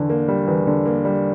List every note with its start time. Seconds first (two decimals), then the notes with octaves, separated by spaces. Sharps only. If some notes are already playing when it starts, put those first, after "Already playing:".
Already playing: E2 D3
0.10 A#3
0.28 G3
0.48 E2
0.67 D3
0.86 A#3
1.05 G3